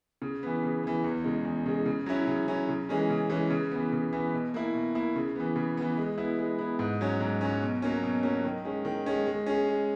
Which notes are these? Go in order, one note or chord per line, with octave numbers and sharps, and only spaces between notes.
C#3
E3 B3
C#3
E3 B3
E2
C#3 G#3
E2
C#3 G#3
C#3
F#3 C#4 E4
C#3
F#3 C#4 E4
C#3
E3 G#3 C#4
C#3
E3 G#3 C#4
C#3
E3 B3
C#3
E3 B3
B2
A#3 E4
B2
A#3 E4
C#3
E3 B3
C#3
E3 B3
G#3
B3 E4
G#3
B3 E4
G#2
F#3 C#4
G#2
F#3 C#4
B2
F#3 A#3 C#4
B2
F#3 A#3 C#4
D#3
G#3 C#4
D#3
G#3 C#4
G#3
C#4 G#4
G#3